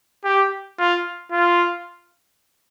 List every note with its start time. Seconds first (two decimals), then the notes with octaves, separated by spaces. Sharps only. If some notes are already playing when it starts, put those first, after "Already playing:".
0.24 G4
0.79 F4
1.32 F4